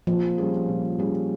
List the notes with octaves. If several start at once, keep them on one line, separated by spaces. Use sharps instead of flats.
A#2 F3
G3 C#4 G#4
A#2
G3 C#4 G#4